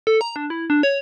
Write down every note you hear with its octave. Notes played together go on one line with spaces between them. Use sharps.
A4
A#5
D4
E4
D4
C#5